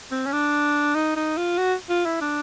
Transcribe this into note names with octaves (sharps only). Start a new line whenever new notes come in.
C4
C#4
D4
D#4
D#4
F4
F#4
F4
E4
D4